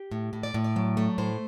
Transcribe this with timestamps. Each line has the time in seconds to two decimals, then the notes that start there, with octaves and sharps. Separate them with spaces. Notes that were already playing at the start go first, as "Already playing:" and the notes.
Already playing: G4
0.11 A2
0.33 A2
0.43 D5
0.54 A2
0.64 D5
0.76 F#3
0.97 A3
1.18 A2 C5